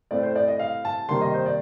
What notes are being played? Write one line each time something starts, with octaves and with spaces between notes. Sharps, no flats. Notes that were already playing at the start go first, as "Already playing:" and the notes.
A2 A3 C4 D5
C5
D5
D#5
F5
A5
C3 D#3 G3 A#3 C6
D#5
C5
D5